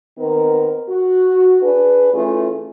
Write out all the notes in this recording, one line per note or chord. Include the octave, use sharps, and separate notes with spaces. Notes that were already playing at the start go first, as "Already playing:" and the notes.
D#3 B3 C4 A#4
F#4
D4 G#4 B4
E3 A3 C#4 F4 G#4